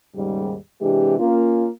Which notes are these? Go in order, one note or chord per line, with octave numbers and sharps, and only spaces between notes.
D#2 G#2 C#3 G3
C3 E3 G#3 D4 G4
A#3 C#4 F4